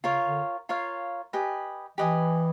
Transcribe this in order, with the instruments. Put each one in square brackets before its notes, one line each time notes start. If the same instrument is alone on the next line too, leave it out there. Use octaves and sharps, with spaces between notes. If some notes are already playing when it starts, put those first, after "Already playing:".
[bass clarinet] C#3 [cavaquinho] F4 A#4 C#5 F5
[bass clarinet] D3
[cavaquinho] F4 A#4 C#5 F5
G4 B4 D#5 G#5
[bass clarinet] E3 [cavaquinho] G4 B4 D#5 G#5